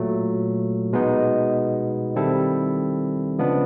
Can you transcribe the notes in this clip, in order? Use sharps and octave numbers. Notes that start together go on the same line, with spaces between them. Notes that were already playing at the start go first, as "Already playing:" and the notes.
Already playing: A#2 F#3 A3
B2 G#3 B3 D#4
D#3 G3 C4 E4 A4
C#3 F3 G#3 B3 D4